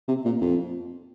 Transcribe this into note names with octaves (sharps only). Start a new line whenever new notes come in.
C3
A#2
F2